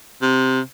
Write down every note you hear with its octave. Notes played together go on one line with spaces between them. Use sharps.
C3